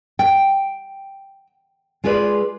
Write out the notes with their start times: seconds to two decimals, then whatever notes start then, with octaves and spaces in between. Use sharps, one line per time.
0.19 G5
2.04 G#3 F4 G#4 B4 D5